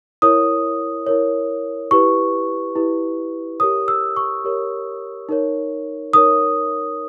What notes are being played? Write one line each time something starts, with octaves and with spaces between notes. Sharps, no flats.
E4 A#4 C#5 D#6
E4 A#4 C#5
E4 G4 B4 C#6
E4 G4 B4
G4 A#4 C#5 D#6
E6
C#6
G4 A#4 C#5
D#4 A#4 C#5
D#4 A#4 C#5 D#6